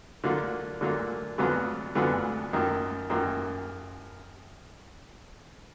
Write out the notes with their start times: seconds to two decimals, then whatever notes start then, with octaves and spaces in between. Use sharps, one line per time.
0.24 D3 F#3 A#3 F4
0.81 D3 F#3 A#3 F4
1.38 F2 D3 F#3 B3 F4
1.95 F2 D3 F#3 B3 F4
2.53 F#2 D#3 A#3 F4
3.10 F#2 D#3 A#3 F4